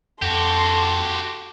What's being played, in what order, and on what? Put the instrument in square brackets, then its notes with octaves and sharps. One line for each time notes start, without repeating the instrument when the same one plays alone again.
[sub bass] F2 [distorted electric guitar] F#4 G4 [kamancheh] A4 C6